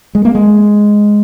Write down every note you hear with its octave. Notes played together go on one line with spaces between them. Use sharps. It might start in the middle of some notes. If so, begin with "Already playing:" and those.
G#3
A#3
G#3